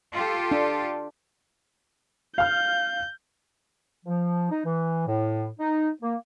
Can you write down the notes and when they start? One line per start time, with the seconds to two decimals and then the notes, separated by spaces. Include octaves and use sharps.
0.12 F4 G4 A4
0.52 D4
2.38 F5 F6 G6
4.06 F3
4.50 D#4
4.66 E3
5.07 A2
5.59 D#4
6.02 A#3